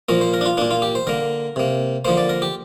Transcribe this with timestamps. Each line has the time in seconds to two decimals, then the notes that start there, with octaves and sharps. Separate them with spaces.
0.09 A#2 F3 A#3 A#4
0.21 C5
0.34 A#4
0.41 D4
0.46 F4
0.57 A#2 A#3 D4
0.71 F4
0.82 G4
0.95 C5
1.07 D3 A#3 A#4
1.56 C3 A#3
2.05 D3 F3 A#3 C5
2.17 D5
2.29 A#4
2.42 G4